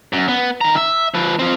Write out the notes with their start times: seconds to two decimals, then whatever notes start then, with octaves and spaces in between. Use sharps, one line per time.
0.13 F#2
0.28 B3
0.61 D#3 A#5
0.76 E5
1.14 F3 B4
1.39 C4 F4